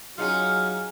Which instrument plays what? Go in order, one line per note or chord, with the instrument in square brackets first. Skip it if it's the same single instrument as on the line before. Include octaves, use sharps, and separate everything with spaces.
[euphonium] F#3 [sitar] C#4 D#4 F4 [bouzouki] G#4 F#5 G#5 [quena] F6